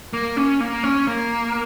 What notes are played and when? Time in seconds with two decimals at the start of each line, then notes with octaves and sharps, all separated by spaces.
0.13 A#3
0.37 C#4
0.61 A#3
0.83 C#4
1.07 A#3